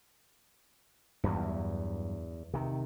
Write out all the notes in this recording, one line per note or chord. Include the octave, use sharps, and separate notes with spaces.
E2 G2 F#3
C3 D#3